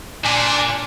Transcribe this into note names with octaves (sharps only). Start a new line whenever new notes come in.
A#2 D4 G#5